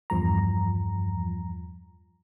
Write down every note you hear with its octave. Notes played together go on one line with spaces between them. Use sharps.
E2 G2 F3 A#5